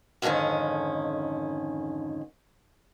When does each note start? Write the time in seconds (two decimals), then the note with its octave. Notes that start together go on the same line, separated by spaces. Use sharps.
0.22 F2 G#2 D3 D#3 C#4